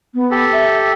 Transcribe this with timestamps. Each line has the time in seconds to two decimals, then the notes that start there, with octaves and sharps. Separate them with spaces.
0.15 B3
0.31 G4 A4
0.52 E5